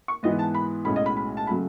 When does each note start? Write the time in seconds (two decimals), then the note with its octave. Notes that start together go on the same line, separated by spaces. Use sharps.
0.08 C#6
0.23 G#2 E3 B3 D#5
0.39 A5
0.54 B5
0.85 B1 A2 G#3 C#4 B5
0.96 D#5
1.06 B5
1.17 B5
1.37 A5
1.47 C#3 F#3 A3 B5